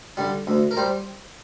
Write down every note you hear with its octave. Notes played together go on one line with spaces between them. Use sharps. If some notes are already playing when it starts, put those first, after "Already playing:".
D3 G3
D2
A#4
G3 C5